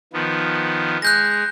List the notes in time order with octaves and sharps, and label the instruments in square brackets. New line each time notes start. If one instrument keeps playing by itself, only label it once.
[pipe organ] D#3 F3 B3
[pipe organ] G#3 [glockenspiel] F#6 G6 A#6